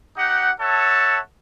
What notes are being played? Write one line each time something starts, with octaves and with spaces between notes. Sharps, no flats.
D#4 G4 F#5
A4 C#5 E5 F#5 A5